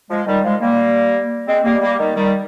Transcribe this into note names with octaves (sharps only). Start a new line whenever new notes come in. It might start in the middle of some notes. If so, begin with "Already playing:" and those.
F3 G#3
D#3 G3
F3 G#3
G3 A#3
G#3 C4
G3 A#3
G3 A#3
D#3 G3
D#3 G3